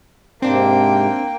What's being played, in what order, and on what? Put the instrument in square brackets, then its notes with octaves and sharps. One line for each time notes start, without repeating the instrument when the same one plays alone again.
[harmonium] G#2 C3 [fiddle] A#3 G5 [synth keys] C4 D4